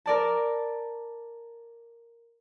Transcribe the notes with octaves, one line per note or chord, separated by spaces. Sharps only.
A#4 D5 A5